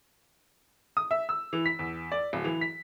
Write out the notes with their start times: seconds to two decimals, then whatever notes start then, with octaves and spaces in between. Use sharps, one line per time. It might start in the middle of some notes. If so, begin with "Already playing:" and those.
0.97 D#6
1.11 E5
1.29 E6
1.53 E3
1.66 B6
1.79 E2
2.12 D5
2.33 D1
2.45 E3
2.61 B6